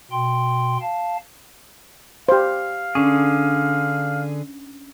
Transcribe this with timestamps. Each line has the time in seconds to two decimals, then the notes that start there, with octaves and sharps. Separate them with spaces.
0.11 B2 G5 C6
0.81 F5 A5
2.29 G4 C5 F5
2.95 D3 C#4 D4 G#4